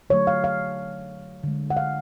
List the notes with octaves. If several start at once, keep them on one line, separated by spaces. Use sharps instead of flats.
D3 F#3 A3 C#5
F5
F5
D3 G#3
F#5
F5